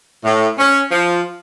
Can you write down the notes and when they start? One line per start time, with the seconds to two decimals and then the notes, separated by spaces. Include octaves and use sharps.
0.24 A2
0.58 C#4
0.91 F3